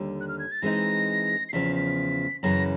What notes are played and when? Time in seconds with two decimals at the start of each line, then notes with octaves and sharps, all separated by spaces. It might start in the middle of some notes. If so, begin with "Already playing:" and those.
Already playing: D#2 D3 G3
0.21 F#6
0.28 F6
0.39 G#6
0.51 A6
0.62 E3 G#3 C4 D#4 A#6
1.49 C7
1.53 E2 C#3 F3 B6
1.76 B6
2.43 F#2 C#3 E3 A#6